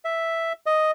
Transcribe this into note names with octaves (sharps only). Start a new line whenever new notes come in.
E5
D#5